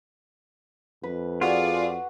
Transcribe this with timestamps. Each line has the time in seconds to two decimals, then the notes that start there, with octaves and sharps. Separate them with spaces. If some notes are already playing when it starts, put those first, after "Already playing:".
1.03 F2 B4
1.41 F4 F#4 G#4 D5